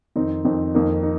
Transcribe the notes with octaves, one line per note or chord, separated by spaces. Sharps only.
F2 D#3 C4 D#4
F2 D#3 C4 D#4
F2 D#3 A#3 D#4
D#4